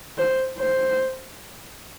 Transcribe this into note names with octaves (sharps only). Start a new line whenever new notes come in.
C5
C5